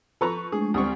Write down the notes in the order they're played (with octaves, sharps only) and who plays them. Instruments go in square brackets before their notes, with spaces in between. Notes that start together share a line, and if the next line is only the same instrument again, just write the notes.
[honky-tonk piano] F3 C#6 [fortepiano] A4 B4 A#5
[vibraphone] G#3 A3 D4 [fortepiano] G#4
[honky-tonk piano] D2 G3 C4 [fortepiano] C#6 D#6